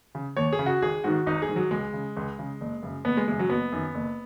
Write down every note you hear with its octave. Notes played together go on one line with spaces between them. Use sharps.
C#3
D#2 C#5
G#4
C#3
F#4
G#1 G#4
G#2 D#3 F#4
G#1 D#4
G#4
G#2 D#3
F#3
C#2 G#3
C#3
C#2
C#3
F#1
F#2 C#3
F#1 B3
G#3
F#2 C#3 G#3
F#3
F#1 B3
F#2 D#3
F#1